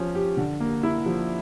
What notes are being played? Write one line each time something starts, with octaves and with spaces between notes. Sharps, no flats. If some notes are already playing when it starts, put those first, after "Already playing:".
Already playing: F3 C#4
G4
D3
A#3
E4
F3